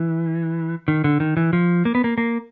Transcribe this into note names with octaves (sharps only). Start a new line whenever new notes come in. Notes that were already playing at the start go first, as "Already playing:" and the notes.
Already playing: E3
D#3
D3
D#3
E3
F3
A#3
B3
A#3
A#3